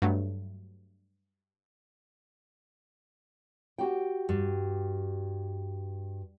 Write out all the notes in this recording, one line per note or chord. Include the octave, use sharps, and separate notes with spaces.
G2 F#3 A3
F#4 G4 G5
G2